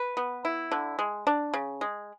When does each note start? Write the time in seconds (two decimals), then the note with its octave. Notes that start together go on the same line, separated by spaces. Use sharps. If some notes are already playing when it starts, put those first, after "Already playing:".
Already playing: B4
0.17 B3
0.45 E4
0.72 D3
0.99 G#3
1.27 D4
1.54 C#3
1.81 G#3